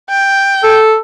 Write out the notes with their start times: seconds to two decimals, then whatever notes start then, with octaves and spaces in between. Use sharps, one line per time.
0.10 G5
0.63 A4